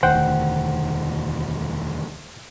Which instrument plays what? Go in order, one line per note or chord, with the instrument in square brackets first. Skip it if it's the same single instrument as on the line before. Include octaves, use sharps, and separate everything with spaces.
[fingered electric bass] E1 D2 D#3 [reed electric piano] C5 F#5 G5